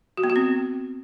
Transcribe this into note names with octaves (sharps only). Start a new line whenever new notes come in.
F#4
B3
F#4
C4